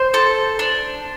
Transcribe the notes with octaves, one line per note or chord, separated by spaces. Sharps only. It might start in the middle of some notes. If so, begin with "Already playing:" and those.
Already playing: C5
A4
D4